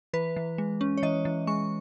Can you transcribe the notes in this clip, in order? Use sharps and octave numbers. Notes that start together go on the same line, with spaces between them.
E3 B4
E3
G#3
C#4
C#5
E3 D#5
E3
G#3 C#6